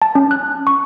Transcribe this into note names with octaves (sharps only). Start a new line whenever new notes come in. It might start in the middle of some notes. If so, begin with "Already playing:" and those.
A5
C#4
F#6
C#6